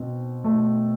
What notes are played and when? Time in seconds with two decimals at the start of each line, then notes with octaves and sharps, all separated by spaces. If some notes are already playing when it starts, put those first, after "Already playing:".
Already playing: B2 C4
0.44 B2 A3